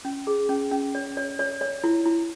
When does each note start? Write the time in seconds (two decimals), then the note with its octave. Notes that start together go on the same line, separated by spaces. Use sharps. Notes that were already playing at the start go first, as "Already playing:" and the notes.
0.05 C#4
0.27 G#4
0.49 C#4
0.72 C#4
0.95 C#5
1.17 C#5
1.39 C#5
1.61 C#5
1.84 E4
2.06 E4